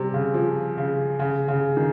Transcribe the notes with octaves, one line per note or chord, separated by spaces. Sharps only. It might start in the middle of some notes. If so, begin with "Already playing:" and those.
Already playing: C3 G3
C#3
F3
C#3
C#3
C#3
D#3